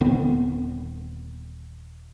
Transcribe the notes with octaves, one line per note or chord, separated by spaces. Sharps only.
D#1 D3 B3 C4